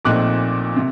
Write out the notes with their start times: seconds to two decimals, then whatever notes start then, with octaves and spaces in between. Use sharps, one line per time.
0.05 A#1 A#2 A3 C4 D#4 D6 F#6
0.76 C3